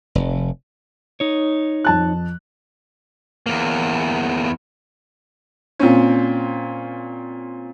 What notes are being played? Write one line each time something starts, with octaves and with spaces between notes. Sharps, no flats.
F1
D#4 C#5
F2 A5 F#6
E2 A#3
A#2 C4 C#4